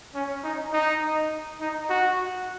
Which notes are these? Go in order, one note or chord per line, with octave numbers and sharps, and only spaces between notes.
C#4
D#4
D#4
D#4
F#4